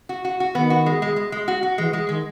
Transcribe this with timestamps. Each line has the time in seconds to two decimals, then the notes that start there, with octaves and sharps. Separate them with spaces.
0.09 F#4
0.25 F#4
0.40 F#4
0.55 D#3 B3
0.70 F#4
0.86 G#3
1.02 G#3
1.16 G#3
1.32 G#3
1.48 F#4
1.63 F#4
1.78 E3 G#3
1.93 G#3
2.09 D#3 G#3